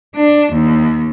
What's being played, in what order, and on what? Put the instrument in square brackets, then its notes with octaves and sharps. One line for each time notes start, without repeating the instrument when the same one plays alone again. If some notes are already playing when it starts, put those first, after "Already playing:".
[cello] D4
D#2